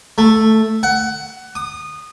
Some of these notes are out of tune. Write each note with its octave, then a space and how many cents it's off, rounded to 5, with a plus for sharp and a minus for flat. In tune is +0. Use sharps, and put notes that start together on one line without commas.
A3 +0
F#5 +20
D#6 -20